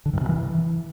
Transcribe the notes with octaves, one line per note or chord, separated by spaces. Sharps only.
D3
G2
C3
E3